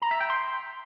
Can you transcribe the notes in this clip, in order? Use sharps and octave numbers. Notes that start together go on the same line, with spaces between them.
A#5
E5
G5
C6